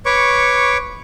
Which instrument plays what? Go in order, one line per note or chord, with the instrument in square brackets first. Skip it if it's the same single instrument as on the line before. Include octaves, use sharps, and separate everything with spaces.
[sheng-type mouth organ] B4 C#5 C#6 D6